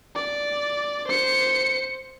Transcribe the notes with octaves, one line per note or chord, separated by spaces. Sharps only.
D5
C5 C#7